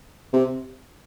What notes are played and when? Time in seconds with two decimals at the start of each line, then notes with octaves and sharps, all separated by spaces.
0.33 C3